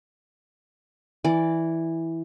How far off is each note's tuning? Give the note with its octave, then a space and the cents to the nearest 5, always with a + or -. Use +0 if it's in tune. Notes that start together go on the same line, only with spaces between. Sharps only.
E3 -5 D5 +0